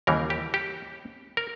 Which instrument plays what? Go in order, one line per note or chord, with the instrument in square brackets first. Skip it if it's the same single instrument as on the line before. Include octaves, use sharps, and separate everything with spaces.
[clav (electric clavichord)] D#2 C#3 E3 G3 A#4
G4
G4
A#4